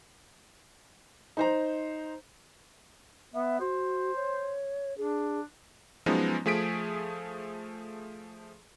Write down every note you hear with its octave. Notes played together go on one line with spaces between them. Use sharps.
D#4 C5 A#5
B3 E5
F#4 C5
C#5
D4 G#4
F3 F#3 G#3 B3 C#4 D#4
F3 A3 G#4 D#6 B6 D7